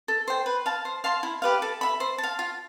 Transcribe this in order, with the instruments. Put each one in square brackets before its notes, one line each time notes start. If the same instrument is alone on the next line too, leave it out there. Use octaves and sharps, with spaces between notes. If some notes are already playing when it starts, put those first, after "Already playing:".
[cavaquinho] A4
C5 G5
B4
F5 A5
C5
F5 A5 C6
E4
G4 B4 F5
A4
E5 B5
C5
A5
F5
F4